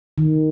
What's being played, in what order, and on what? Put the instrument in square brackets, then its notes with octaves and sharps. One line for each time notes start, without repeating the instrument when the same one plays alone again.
[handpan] D#3